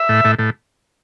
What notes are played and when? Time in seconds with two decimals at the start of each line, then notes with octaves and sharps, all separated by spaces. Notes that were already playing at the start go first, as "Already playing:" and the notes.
Already playing: E5
0.09 A2
0.25 A2
0.39 A2